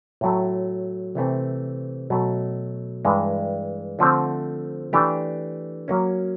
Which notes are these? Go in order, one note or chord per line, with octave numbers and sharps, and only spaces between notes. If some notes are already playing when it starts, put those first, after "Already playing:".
A2 F#3 A3
C3 E3 A3 C4
B2 F#3 A3
G2 E3 G#3
D3 F3 A3 C4
E3 A3 D4 G4
F#3 A#3 C#4